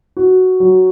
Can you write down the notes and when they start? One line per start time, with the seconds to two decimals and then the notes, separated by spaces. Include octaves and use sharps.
0.17 F#4
0.60 F#3